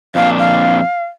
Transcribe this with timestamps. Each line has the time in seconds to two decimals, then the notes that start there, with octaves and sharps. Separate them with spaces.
0.15 F2 A#2 D4 F5
0.39 F5